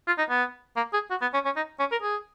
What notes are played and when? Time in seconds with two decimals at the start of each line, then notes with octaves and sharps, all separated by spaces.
0.07 F4
0.18 D#4
0.29 B3
0.77 A#3
0.93 G#4
1.10 F#4
1.22 B3
1.34 C#4
1.45 C#4
1.56 D#4
1.79 C#4
1.92 A#4
2.02 G#4